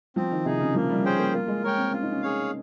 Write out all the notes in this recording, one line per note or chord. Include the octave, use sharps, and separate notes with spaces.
F3 C4
D#3
C3 D#4 G#4
C#3
F3 A#3
G3
C#4 G#4 C5 G5
A#3
A#3 F4
G#3
G#3 A#4 C#5 G5
C4
C#4 F4
D#4
C#4
G#4 C#5 F5